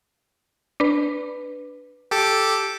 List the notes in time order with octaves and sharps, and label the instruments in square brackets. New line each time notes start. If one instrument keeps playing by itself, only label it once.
[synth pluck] D4 B4
[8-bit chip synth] G4 A4 D6